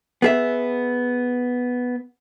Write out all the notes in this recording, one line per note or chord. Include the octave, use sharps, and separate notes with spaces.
B3 G#4 E5